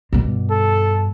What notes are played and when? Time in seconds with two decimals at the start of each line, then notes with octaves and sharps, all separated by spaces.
0.13 G2 B2
0.51 A4